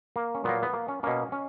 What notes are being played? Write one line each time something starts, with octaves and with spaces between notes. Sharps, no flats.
A#3
C#4
A#2 F#3 A#3 B3
B3
A#3
C#4
B2 A#3 C#4
C#4